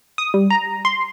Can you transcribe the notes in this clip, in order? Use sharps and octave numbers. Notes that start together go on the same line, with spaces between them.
D#6
G3
A#5
C6